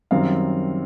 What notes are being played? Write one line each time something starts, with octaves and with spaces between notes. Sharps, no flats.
F#2 D#3 G3 C4 F5